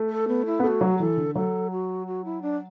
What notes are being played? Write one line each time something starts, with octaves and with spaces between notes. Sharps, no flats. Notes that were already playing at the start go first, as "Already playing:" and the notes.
Already playing: A3
A4
B3
E4
B3
A3 F#4 A4
F#3
E3 A4
D3
F#3 A4
F#4
F#4
E4
D4